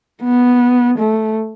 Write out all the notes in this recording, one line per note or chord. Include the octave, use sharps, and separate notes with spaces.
B3
A3